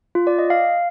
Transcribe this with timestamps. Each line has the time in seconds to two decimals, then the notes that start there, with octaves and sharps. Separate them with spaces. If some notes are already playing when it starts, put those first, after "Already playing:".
0.15 F4
0.27 D5
0.39 D#5
0.50 F5